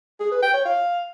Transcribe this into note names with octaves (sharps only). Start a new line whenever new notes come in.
G#4
B4
G5
C#5
F5